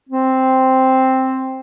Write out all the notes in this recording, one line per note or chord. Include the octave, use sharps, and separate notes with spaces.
C4